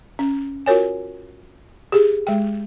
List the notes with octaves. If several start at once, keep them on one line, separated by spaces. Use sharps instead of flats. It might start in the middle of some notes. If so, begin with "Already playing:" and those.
C#4
F4 F#4 A#4 C#5 G#5
G4 G#4
G#3 G5